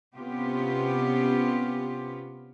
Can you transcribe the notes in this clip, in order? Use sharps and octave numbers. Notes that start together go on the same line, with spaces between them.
C3 B3 C#4 F4 G4